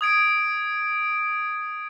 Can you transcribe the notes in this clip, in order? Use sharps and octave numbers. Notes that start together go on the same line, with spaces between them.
D#6 G#6 D7